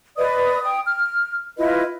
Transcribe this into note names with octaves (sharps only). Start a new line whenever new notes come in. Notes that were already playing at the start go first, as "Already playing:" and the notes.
B4 D5 D#5 D#6
G5 D#6
F6
E4 F4 B4 D#5